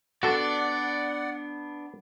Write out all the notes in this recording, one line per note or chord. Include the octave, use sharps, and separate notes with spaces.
B3 D4 F#4 A4 D5 F#5